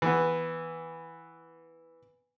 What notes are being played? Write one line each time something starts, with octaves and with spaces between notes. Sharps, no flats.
E3 B3